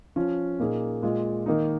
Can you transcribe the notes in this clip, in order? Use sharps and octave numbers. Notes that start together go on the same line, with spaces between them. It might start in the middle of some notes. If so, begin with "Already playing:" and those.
F3 C#4 F4
A#2 A#3 D#4 G#4
A#2 G#3 F4
D#3 A#3 D#4